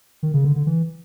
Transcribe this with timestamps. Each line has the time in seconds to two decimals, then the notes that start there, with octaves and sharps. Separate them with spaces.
0.23 D#3
0.34 C#3
0.45 D3
0.56 D3
0.66 E3